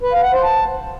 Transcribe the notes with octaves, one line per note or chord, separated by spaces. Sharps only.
B4
F5
F#5
C5
A5